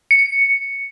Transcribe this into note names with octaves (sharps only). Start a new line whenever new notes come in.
C#7